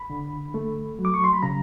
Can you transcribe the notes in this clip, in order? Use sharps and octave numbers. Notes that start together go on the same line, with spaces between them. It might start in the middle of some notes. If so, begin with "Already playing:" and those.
Already playing: B5
D3
A3
F#3
D6
C#6
C6
B5
C#3 A#5